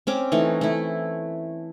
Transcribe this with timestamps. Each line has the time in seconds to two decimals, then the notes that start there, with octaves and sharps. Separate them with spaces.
0.07 C4 C#4 D6
0.32 E3 A3 D#4
0.61 A3 E4